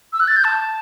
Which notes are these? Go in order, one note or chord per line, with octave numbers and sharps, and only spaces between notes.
E6
F#6
A6
G6
A5